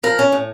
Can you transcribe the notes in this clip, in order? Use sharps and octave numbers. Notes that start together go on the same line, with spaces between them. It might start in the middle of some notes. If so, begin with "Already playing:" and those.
F3 A#4
C#4
A2